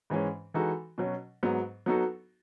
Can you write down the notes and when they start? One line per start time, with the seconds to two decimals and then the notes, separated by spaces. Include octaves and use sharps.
0.10 G#2 E3 G#3 C#4
0.54 E3 G#3 D#4 F#4 A4
0.98 B2 F#3 C#4
1.43 G#2 F#3 B3
1.86 F#3 B3 D#4 F#4 A4